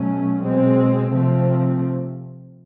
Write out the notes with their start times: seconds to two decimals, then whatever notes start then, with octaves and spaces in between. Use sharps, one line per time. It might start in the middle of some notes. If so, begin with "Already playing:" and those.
Already playing: B2 F#3 A3 C#4
0.39 B2 G#3 C4
1.12 C3 F3 A3 C4